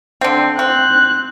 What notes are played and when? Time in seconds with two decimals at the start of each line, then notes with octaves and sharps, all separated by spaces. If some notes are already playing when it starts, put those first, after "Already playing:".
0.21 D3 C4
0.59 C4 F#6